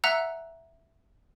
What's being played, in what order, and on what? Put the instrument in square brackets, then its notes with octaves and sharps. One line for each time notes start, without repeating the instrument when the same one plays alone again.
[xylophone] E5 F#5 A#5 E6 F#6